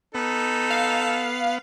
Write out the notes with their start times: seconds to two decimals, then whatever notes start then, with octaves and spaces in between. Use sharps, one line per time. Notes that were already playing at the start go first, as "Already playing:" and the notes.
0.15 B3 D#4 A4
0.70 F5